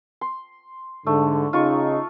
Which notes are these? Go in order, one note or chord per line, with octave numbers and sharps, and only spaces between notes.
C6
G#2 D3 A3
C#3 D#4 F4 C#6